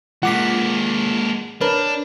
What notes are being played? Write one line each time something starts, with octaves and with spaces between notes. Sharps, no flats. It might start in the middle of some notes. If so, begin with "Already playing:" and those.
G#3 A#3 F4 F#5 D6 B6
D4 A#4 B4 C#5 B5